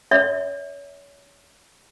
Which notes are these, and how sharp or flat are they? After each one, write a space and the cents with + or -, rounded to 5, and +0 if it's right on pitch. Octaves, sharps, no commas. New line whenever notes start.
C#5 +30 E5 -30